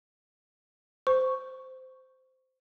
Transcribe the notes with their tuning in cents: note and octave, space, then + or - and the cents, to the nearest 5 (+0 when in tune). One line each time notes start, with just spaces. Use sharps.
C5 -15 C#6 +0